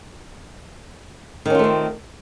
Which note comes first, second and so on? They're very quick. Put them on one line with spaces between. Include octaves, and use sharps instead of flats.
D#3 C#4 F4 A3 C4